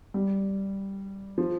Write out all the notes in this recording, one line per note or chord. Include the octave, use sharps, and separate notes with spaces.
G3
F3